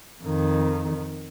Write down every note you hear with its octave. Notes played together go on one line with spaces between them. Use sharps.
F2 D#3